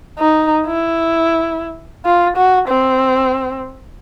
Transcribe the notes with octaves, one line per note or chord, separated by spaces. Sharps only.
D#4
E4
F4
F#4
C4